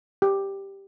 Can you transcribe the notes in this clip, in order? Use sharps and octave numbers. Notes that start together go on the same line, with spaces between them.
G4